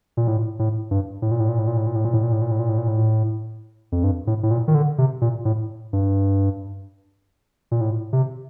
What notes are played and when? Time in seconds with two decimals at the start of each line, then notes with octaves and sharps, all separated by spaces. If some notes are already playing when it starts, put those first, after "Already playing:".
0.17 A#2
0.27 A2
0.59 A2
0.91 G2
1.22 A2
1.31 A#2
1.40 A2
1.49 A#2
1.59 A2
1.67 A#2
1.77 A2
1.87 A#2
1.96 A2
2.04 A#2
2.14 A2
2.23 A#2
2.32 A2
2.42 A#2
2.51 A2
2.60 A#2
2.69 A2
2.78 A#2
2.88 A2
3.92 F2
4.04 G2
4.27 A2
4.43 A2
4.51 A#2
4.68 D#3
4.75 D3
4.98 C3
5.21 A#2
5.45 A2
5.93 G2
7.71 A#2
7.81 A2
8.13 C3